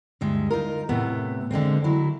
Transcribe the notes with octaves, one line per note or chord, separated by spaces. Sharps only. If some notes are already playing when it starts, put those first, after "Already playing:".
D2 G2 G#3 E5
D#4 F4 A#4
A2 C3 A3 B3
D3 G#3 A#3 C4
F#3 E4